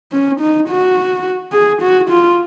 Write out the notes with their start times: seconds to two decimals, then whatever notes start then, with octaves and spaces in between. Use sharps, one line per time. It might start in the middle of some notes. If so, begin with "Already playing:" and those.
0.12 C#4
0.41 D#4
0.69 F#4
1.53 G#4
1.82 F#4
2.10 F4